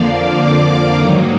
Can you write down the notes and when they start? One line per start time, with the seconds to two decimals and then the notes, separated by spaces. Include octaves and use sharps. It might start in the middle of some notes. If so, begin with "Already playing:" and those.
Already playing: F2 D3 F3 A#3 D5 F5
0.09 D6
0.39 D6
0.68 D6
0.97 G#2 D#3 F#3 A#3 D#4 A#5